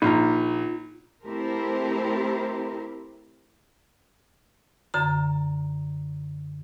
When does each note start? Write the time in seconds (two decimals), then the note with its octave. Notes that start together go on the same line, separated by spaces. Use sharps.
0.02 A#1 D#4 F4 A#5
1.23 A3 C4 E4 G4 A#4 C5
4.94 F#2 D3 A#5